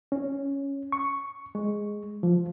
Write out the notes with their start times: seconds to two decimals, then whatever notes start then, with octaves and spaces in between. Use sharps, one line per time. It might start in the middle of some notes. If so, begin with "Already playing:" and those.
0.12 C#4
0.92 C#6
1.55 G#3
2.23 F3